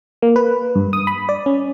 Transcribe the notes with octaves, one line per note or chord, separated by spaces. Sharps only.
A#3
B4
G2
D#6
B5
D5
C#4